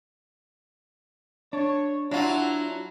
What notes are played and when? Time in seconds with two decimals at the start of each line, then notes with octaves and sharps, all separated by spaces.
1.53 D4 C#5
2.11 F#3 D4 E4 F4